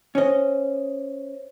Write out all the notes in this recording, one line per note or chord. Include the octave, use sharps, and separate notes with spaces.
C#4 C5 C#5 D#5